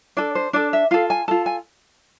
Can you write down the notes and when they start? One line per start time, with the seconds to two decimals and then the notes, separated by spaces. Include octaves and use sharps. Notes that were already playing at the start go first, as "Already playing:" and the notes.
0.17 D4 A4 D5
0.35 C5
0.53 D4 A4 D5
0.73 E5
0.91 F4 A4 F5
1.10 G#5
1.28 F4 A4 A5
1.46 G#5